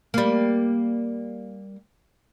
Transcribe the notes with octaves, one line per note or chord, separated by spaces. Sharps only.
G3 A#3